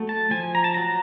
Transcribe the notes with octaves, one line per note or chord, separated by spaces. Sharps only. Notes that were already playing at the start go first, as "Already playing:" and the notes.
Already playing: F#3 A3
A5
F3 G#5
A#5
A5
F#3 A#5